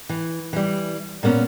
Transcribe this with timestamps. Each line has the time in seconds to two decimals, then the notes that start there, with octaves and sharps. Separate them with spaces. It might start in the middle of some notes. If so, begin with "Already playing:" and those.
0.09 E3
0.53 E3 G3
1.23 A#2 A#3 B3 C#4